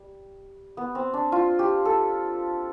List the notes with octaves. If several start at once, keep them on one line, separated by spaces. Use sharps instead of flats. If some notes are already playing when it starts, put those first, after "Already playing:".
Already playing: G3
B3
C4
D4
F4
G4
A4